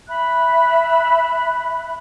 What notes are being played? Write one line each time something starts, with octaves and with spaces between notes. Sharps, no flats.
E5 B5 F#6